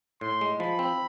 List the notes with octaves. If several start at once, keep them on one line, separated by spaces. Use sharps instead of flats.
A2 C6
G#3
F3 B5
C4